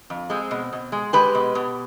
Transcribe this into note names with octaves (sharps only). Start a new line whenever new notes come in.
F2
G#3 C4
B2
B2
G#3
G#3 G4 B4
B2
B2